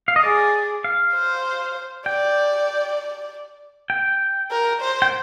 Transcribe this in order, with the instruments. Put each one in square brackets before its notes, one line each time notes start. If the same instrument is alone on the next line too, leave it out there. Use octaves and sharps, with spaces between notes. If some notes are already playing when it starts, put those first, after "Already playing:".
[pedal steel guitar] F5
D#5
[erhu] G#4 [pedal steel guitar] D5
[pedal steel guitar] F5
[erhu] C5
[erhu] D5 [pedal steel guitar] G5
[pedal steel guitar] G5
[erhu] A#4
C5
[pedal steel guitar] G5